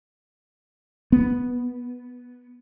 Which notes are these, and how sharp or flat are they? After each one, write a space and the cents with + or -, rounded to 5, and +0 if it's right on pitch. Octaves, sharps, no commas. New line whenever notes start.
B3 -5